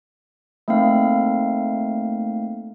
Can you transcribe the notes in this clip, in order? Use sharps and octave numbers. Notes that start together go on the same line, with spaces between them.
A3 A#3 C4 D#4 F5